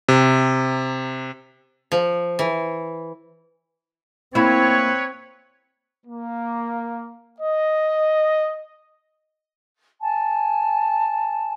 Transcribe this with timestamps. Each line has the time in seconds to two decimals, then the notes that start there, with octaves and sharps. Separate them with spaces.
0.08 C3
1.92 F3
2.39 E3
4.35 A#3 C4 E4 B4 C#5
6.06 A#3
7.41 D#5
10.00 G#5 A5